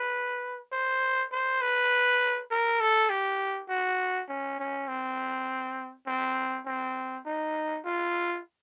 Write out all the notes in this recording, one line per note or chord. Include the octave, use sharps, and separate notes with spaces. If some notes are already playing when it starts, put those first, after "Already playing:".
Already playing: B4
C5
C5
B4
A#4
A4
G4
F#4
C#4
C#4
C4
C4
C4
D#4
F4